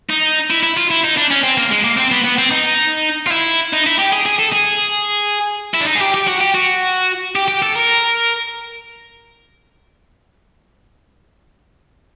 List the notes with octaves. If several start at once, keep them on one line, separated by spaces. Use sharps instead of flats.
D#4
E4
E4
F4
E4
D#4
D4
C#4
C4
A#3
G#3
A#3
C4
B3
B3
C4
D#4
F4
E4
D#4
E4
G4
G#4
G#4
A4
G#4
E4
D4
D#4
G#4
G4
G4
F#4
G4
F#4
G4
G4
A4
A#4